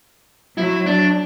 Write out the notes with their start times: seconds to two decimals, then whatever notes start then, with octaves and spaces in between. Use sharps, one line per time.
0.58 F#3 E4
0.87 D4